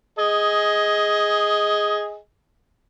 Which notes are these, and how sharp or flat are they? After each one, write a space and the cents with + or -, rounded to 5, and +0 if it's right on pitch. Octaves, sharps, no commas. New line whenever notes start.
G#4 +0 D#5 +15